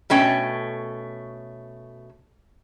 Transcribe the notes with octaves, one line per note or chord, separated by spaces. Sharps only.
B2 A3 C#4 G5